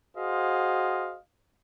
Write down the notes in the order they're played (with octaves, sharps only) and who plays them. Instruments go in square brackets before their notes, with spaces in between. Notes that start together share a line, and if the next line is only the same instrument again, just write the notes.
[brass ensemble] F#4 G#4 C5 D#5 F5